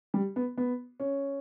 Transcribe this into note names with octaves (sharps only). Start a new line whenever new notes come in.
G3
B3
B3
C#4